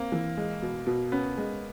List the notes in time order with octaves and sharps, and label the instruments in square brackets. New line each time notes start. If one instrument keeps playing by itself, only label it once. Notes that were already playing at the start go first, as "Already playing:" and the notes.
Already playing: [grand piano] A#3 [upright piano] C4
[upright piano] E3
G#3
B2
B2
[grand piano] B3 [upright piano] C#4
[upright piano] G#3